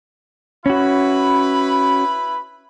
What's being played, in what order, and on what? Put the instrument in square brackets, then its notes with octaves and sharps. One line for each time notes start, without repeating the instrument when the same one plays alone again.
[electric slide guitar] C#4 F#4 [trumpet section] E4 B4 B5